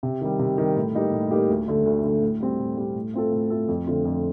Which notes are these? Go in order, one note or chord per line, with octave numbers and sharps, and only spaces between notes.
C3
D#3 G3
C3
D#3 G3
A2
G3 A#3 D#4 G4
A2
G3 A#3 D#4 G4
D2
D3 A3
D2
D3 A3
A2
G3 C4
A2
G3 C4
A2
A3 C4 F4 A4
A2
A3 C4 F4 A4
F2
D3 A3 C4 F4
F2